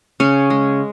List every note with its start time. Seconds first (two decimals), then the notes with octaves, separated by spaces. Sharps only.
0.20 C#3 C#4
0.50 G#3